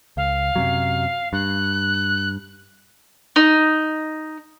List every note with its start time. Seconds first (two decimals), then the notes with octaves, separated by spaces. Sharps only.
0.17 C#2 F5
0.56 F#2 C3 F#3
1.33 G2 F#6
3.36 D#4